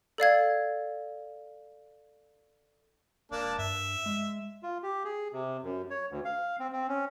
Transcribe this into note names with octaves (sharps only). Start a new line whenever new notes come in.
A4 D5 F5 G#6
E1 A#3 D4 A5
G2 E5
G#3
F4
G4
G#4
C3
F#2
C#5
D2
F5
C4
C4
C#4